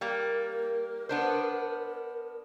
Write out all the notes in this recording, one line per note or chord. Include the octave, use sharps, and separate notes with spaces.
G3 A#3 A#4
B3 D4 C5